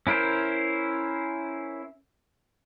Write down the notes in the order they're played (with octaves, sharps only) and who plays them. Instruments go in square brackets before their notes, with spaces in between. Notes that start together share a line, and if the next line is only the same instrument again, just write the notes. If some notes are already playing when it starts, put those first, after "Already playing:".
[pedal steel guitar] C#4 E4 A#4 C5